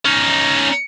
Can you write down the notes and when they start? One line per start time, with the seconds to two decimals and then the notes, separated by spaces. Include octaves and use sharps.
0.05 C#4 D#4